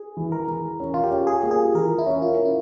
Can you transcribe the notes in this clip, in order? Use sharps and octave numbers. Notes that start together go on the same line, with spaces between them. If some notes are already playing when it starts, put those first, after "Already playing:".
Already playing: G#4
E3
A#4
E3
C#4
F4
G4
C#4
G#4
A#3
G#4
E3 A#4
E4
C#4
F4
C#4
E4